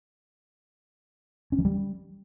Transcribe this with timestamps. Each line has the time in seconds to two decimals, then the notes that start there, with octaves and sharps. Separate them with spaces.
1.52 C#4
1.58 E3
1.65 G3